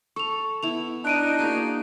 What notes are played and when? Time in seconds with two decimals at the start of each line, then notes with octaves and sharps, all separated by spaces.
0.16 A4 C#6 F7
0.63 B3 E4 F7
1.05 D4 D#4 F#6 D7 D#7
1.39 A#3 F#4 G#4